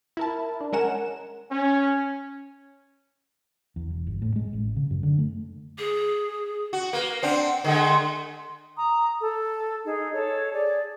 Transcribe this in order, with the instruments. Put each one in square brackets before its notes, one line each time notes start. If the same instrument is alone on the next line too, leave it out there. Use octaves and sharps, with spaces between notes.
[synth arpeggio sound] E4 A#4 A5
D4
G#3 C#4 A#4 F#5 G#5 E7
[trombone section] C#4
[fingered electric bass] E2
E1
G1
A2
G#3
A1
C#3
F#2
D3
A3
[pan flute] G#4
[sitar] F#4
[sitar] A#3 [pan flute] B4
[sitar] C4 D4 [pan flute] F#5
[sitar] D3 G#3 A3
[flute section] A#5 D#6
A4
D#4 G#4
A4 C#5
G#4 D5